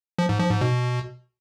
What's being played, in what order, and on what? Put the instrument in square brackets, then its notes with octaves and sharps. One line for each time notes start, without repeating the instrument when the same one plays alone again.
[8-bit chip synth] F3
G#2
F3
G#2
B2